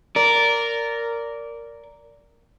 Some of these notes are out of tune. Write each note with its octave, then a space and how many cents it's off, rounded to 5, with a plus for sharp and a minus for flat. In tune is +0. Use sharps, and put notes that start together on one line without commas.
A#4 -5 D5 -15